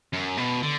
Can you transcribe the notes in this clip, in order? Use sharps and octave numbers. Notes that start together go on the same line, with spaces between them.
F#2
B2
D3